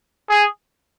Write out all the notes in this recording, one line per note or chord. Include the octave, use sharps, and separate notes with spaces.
G#4